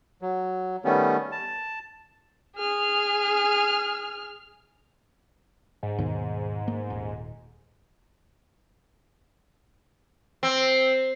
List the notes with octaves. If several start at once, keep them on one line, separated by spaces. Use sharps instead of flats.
F#3
D#3 G3 A3 B3 C#4
A5
G#4 F6
G#2
D#2 B2
A#3
D#1
C4